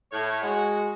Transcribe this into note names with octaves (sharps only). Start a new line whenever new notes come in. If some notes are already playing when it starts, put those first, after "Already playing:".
A2 C#5
G#3 F#4